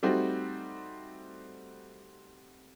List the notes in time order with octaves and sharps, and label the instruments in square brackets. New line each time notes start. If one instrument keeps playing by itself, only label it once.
[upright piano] G3 A3 C4 D#4 F#4